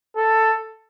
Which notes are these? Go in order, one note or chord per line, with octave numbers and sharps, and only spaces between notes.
A4